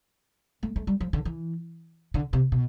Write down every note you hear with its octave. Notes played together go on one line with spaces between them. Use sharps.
A3
A3
G3
F3
D3
E3
D3
C3
B2